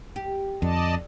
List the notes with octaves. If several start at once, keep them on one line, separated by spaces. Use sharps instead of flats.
G4
F2 D3 D5 D#5 A5